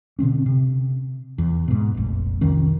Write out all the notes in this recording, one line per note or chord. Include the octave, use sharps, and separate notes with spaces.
B2 D3 C4 C#4
C3
E2
G#2 B2
F1 A#1
C2 F2 D#3 C#4